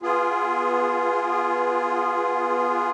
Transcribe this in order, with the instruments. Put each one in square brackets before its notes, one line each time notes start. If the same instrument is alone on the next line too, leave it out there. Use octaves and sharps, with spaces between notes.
[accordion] B3 F4 G#4